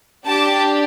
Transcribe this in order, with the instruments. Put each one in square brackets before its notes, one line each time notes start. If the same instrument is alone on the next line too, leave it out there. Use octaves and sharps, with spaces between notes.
[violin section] D4 G4 A5 D6